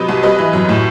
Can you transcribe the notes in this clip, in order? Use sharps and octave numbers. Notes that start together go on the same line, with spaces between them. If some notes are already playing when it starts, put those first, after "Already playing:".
Already playing: C3 F#3 B4 D#5
C2
G3 B4 D#5
E3
F#2
A2